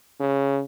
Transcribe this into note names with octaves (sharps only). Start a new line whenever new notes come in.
C#3